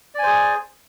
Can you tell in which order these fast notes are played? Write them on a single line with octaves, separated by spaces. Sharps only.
D5 G#5 C5 G#4